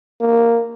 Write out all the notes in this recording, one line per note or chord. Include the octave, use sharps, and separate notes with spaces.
A#3